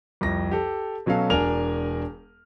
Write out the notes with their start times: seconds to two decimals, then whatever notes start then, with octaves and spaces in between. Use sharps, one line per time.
0.21 C2 F2 A#6
0.51 G4 A4
1.06 B2 F#3 C#4 A4 F5
1.30 E1 D4 A#4 G#5 F6 F7